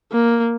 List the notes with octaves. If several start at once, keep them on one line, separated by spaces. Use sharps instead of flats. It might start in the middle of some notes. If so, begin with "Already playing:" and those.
A#3